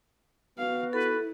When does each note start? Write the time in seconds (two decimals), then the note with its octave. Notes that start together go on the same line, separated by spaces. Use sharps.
0.58 B3 F#4 F5
0.93 E4 A4 B4